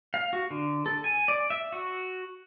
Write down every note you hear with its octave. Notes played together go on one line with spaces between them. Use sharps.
F5
F#4
D3
A4
G#5
D5
E5
F#4